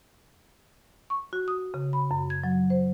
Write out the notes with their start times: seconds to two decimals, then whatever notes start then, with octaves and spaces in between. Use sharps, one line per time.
1.10 C#6
1.33 F#4
1.48 D#6
1.74 C#3
1.93 B5
2.11 F#2
2.30 G#6
2.43 F#3
2.70 C5